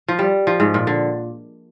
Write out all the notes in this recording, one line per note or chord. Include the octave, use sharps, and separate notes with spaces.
F3
G3
F3
G#2
A#2
D3